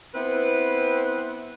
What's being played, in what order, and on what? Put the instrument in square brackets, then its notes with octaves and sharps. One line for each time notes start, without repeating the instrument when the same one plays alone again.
[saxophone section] B3 C4 E4 B4